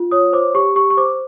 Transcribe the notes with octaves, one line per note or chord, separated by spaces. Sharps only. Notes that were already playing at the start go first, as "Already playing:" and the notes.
Already playing: F4
C#5 D#6
C5 D6
G4 C#6
G4 C#6
C#6
C5 D6